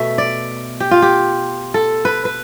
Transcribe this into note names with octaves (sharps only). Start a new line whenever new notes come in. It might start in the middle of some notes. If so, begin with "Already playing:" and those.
Already playing: B2 A3 E5
D5
G4
F4
G4
A4
B4
B4